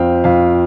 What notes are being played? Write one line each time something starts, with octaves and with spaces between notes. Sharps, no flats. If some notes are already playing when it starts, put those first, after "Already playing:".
Already playing: F2 C4 F5 G5
F2 F5